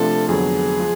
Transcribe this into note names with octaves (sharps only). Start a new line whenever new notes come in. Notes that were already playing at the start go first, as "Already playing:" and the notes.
Already playing: C3 F3 A3 D4 F4 A4
F2 D3 F#3 B3 G#4
F3 G#3